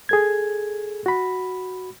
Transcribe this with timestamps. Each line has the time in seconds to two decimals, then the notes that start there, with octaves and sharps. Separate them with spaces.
0.09 G#4 A4 G#6
1.06 F#4 B5